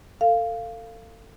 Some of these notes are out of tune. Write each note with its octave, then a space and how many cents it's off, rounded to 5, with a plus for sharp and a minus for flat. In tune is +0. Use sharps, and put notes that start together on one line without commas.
A4 +30 F5 -10